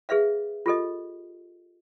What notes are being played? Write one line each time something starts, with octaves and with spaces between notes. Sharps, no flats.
G#4 B4 E5 F5
F4 G4 A4 D#5